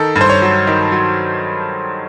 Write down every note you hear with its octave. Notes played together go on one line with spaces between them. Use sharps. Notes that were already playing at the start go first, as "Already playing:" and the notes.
Already playing: D#3 A4
G2
C5
C#5
F#3
D#3
F#3